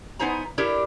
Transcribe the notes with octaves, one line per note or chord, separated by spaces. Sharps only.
B3 D#4 E4 C5 G#5 A#5
D4 E4 G4 A4 A#4